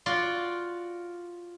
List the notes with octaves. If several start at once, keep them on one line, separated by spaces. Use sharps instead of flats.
F4 F#4 D5 C6